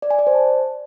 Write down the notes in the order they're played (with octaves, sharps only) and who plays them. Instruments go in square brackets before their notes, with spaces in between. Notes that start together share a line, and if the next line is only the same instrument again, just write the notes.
[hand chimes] D5
G#5
D5
C5
A5